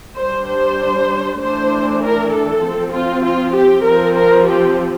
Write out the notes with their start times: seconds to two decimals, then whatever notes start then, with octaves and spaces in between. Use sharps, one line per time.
0.19 G3 D4 C5
0.49 C5
1.40 E3 A3 D4 C5
2.02 A#4
2.32 A4
2.63 F3 C4
2.94 F4
3.24 F4
3.54 G4
3.85 F3 C4 A#4
4.16 A#4
4.47 G4